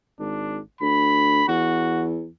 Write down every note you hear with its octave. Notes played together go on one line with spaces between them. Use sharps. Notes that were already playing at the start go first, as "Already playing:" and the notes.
G#1 D4
D2 B5
E2 F#4